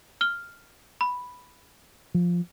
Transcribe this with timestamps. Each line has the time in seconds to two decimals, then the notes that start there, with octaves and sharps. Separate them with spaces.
0.21 F6 G7
1.01 B5
2.15 F3